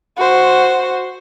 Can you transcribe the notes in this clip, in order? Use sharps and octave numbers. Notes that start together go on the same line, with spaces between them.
F#4 C5